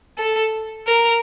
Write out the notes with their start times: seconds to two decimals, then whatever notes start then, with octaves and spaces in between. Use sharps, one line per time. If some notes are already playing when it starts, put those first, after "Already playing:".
0.18 A4
0.87 A#4